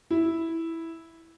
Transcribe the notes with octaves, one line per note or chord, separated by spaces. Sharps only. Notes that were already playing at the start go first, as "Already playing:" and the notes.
E4